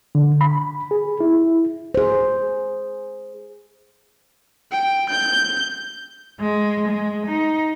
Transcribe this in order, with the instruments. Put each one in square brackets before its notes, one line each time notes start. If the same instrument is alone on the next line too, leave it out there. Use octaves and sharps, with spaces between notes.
[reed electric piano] D3
B5
G#4
E4
[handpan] G#4 C5
[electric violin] G5
G6
[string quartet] G#3
G#3
D#4